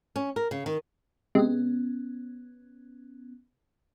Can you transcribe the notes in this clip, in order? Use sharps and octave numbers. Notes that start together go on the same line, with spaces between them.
C#4
A#4
C#3
D#3
C3 G#3 B3 C#4